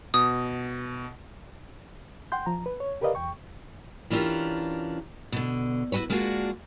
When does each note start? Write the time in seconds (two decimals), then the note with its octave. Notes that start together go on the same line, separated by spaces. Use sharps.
0.14 B2 D#6
2.32 F#5 G5 C6 G6
2.46 F3 A#5
2.66 B4
2.80 C#5
3.01 G4 A#4 B4 D5 D#5 F5
3.15 E2 G5 C#6
4.10 E3 C#4 D4 F4 G4 A#4
5.32 B2 D3
5.92 E4 F#4 G4 B4 C#5
6.10 G#3 A#3 D4 F4 F#4